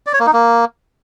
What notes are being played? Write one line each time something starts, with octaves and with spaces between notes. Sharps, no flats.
D5
C#5
A#3
D#4
A#3